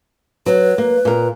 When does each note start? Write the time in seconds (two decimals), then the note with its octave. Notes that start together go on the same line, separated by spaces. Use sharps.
0.46 F#3 B4
0.78 A#3
1.05 A#2 A#4